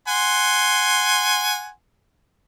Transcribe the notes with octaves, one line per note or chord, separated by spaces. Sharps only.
F#5 G#5 C6